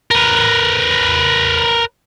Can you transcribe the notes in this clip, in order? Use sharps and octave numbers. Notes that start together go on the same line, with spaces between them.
A#4 B4